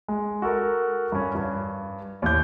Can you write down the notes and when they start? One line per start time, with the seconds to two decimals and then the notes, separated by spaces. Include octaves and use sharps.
0.08 G#3
0.42 F#4 A4 A#4
1.12 G2 C#4
1.35 G2
2.22 D#2 A2 G6